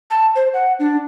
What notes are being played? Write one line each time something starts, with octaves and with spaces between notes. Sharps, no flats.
A5
C5
F#5
D4